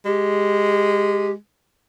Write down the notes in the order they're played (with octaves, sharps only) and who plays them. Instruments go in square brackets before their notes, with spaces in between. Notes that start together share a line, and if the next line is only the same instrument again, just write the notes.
[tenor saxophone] G#3 [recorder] G4